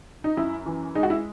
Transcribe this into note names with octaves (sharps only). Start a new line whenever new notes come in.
D#4
F#2 E4
E3
G#3 D#4
F#4
E4